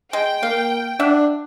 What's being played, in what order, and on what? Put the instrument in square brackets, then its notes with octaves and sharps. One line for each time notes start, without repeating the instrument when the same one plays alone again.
[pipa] G#3 [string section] G5
[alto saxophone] A#3 [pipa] F5
[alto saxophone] D4 [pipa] E5 F#5